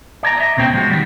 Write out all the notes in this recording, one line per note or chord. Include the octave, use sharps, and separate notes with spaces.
D5 G#5 A#5
D#5 E5
C#2 B2 C4 C#4 G5
F3 G#3 F#4
D#3 G3